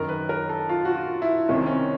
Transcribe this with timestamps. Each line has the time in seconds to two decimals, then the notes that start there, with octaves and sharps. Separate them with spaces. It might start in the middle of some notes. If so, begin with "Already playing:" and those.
Already playing: F#2 D#3 A#4
0.09 B4
0.29 A#4
0.49 A4
0.69 F4
0.85 F#4
0.95 F4
1.22 E4
1.49 C2 C3 D#3 C#4
1.57 C4
1.66 C#4